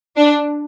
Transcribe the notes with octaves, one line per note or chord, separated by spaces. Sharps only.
D4